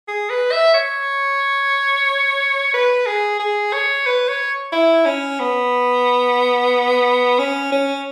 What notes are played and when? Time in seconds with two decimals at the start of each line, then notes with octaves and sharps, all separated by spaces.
0.08 G#4
0.30 B4
0.52 E5
0.74 C#5
2.74 B4
3.06 G#4
3.40 G#4
3.73 C#5
4.07 B4
4.28 C#5
4.72 E4
5.06 C#4
5.40 B3
7.39 C#4
7.72 C#4